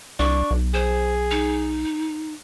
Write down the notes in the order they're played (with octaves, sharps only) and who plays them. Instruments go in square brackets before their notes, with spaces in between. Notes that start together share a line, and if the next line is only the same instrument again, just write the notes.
[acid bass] C2 [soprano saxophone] D4 [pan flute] C#6
[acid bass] B1
[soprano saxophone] G#4 [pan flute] C5
[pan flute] D#4